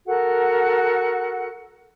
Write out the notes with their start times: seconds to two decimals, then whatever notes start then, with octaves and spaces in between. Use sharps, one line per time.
0.06 F#4 A4 A#4 F#5